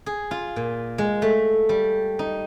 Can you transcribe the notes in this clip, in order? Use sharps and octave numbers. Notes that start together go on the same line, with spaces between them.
G#4
F4
A#2
G#3
A3
G3
D#4